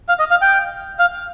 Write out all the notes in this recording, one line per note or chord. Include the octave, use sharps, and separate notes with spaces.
F5
D#5
F5
G5
F5